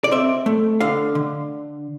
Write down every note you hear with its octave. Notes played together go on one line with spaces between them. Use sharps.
D5
C4 E5
A3
D3 F5
D3